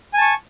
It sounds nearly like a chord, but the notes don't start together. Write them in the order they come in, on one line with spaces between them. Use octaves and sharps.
G#5 A5 C#6